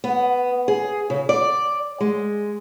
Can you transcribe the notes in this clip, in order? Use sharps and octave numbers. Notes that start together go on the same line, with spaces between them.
B3
G#4
C#3
D5
G#3